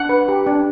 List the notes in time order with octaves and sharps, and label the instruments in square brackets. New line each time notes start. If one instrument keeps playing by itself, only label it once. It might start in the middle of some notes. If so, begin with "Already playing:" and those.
Already playing: [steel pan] D4 F#5
B4
G4
D4